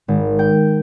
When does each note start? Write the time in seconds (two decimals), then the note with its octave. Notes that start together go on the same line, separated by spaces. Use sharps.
0.08 G#1
0.39 G5